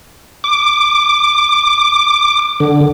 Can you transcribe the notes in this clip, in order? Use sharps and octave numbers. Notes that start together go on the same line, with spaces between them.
D6
D3